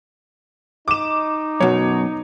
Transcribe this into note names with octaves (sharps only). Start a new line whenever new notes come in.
D#4 D6 E7
F#2 B2 C#5